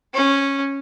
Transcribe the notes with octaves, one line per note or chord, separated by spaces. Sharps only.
C#4